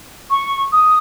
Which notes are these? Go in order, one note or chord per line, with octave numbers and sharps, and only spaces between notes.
C#6
D#6